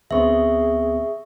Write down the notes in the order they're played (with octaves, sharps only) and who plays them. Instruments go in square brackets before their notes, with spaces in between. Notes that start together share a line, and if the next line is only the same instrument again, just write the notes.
[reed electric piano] D2 B3 C4 [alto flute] G#4 [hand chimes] E5 C#6